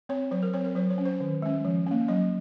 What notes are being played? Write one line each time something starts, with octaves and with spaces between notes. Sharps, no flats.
C4 C#5
F#3 C5
A#4
C4 C#5
A#4
F#3 C5
C#5
C#4
C5
D#3
G#3 C#4
F3
A#3 C#4
F#3 D#5